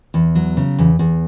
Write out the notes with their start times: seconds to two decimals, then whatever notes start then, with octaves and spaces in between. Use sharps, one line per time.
0.14 E2
0.35 F#3
0.57 C#3
0.79 E2
0.99 E2